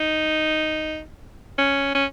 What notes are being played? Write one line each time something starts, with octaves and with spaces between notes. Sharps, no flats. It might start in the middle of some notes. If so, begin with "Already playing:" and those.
Already playing: D#4
C#4
C#4